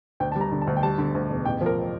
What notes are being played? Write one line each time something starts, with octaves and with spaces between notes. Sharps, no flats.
D2 G5
G3 A5
A#5
D3
A5
D2
G5
G3 A5
D3
D2
E1
A1 G5
F3
A#4